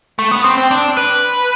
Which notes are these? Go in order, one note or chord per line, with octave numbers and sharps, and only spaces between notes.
A3
B3
C4
C4
D4
B4